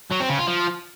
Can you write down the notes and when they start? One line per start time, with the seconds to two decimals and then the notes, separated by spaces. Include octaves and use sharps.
0.11 F#3
0.20 C4
0.29 C#3
0.38 F4
0.47 F3